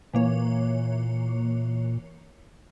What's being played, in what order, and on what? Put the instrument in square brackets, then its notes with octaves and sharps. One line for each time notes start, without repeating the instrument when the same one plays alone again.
[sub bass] A#2 [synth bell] E3 A#3 C#5